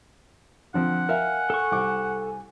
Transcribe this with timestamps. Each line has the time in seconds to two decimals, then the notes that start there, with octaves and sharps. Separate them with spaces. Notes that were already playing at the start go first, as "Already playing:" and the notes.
0.74 D3 F3 C4 F#5
1.09 A#4 E5 F5 G#5
1.50 A4 C#6
1.71 C2 D6